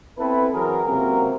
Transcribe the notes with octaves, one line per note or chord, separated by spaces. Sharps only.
B3 C4 E4 A4 B4
E3 F#3 F#4 G#4 A#4
C#2 C3 F#3 A#3 G4 A#4